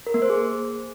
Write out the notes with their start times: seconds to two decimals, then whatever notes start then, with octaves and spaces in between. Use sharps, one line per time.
0.07 A#4
0.14 A#3
0.22 C5
0.30 G#4